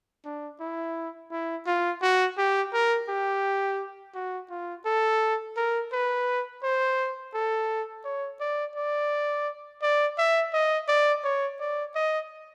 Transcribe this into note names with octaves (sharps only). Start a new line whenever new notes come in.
D4
E4
E4
F4
F#4
G4
A#4
G4
F#4
F4
A4
A#4
B4
C5
A4
C#5
D5
D5
D5
E5
D#5
D5
C#5
D5
D#5